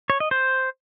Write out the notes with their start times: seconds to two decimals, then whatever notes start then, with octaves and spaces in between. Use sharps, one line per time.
0.10 C#5
0.20 D#5
0.31 C5